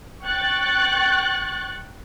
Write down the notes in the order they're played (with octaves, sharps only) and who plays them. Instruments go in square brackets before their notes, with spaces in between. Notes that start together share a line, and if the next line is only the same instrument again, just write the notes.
[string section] G5 C#6 F#6 A6